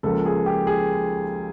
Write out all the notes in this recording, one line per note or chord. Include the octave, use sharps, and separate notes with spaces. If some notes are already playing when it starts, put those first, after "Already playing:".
C#2 C#3 F3 A#3 A4
G#4
G4
G#4